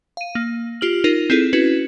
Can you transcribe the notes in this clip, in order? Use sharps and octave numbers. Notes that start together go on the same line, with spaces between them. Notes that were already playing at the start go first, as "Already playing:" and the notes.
F5 D#7
A#3
F4 G4 F6 F#7
D#4 F4 A#4
C4 E4 G#4 A4
C#4 E4 F#4 B4